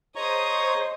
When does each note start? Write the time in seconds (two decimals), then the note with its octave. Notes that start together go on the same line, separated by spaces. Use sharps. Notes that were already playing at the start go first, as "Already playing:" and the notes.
0.15 G#4 C5 C#5 D#5 A#5 C#6 D#6